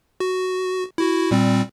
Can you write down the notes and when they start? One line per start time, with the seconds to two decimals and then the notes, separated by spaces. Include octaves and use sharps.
0.20 F#4
0.98 E4 F#4
1.31 A#2 G3 C4